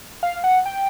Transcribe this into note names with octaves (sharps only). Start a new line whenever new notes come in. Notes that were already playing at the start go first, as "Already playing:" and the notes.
F5
F#5
G5